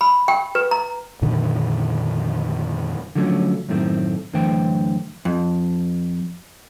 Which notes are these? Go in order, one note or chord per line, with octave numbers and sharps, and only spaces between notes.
B5
G5
B4
A#5
F2 A#2 D3 D#3
D3 F3 F#3 A3 B3 C#4
F#2 A2 D#3 A3 C4
F#2 D3 E3 A3 C5 G5
F2